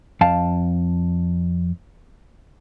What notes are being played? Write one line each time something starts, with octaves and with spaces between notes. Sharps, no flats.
F2 F5 G5 A5